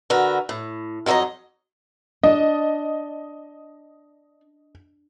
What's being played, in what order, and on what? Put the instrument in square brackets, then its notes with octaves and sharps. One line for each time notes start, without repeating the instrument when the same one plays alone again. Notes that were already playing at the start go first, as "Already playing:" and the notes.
[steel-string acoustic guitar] D3 F#4 A#4 B4
A2
F2 F#3 A3 D#4 D#5
[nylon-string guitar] D4 [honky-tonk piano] D#5